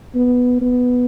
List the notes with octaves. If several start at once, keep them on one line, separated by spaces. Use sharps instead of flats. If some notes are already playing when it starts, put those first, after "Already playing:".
B3
B3